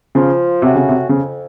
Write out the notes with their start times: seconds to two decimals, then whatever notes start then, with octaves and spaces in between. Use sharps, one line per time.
0.15 C#3 F3
0.62 C3 A3 C#4 F#4
0.75 C#3
0.88 C3
1.09 F2 C#3